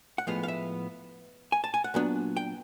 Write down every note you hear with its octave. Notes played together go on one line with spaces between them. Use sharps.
F#5
A2 F3 G#3 B3 F5
F5
E5
G#5
A5
G#5
F#5
A#2 F#3 B3 D4
G5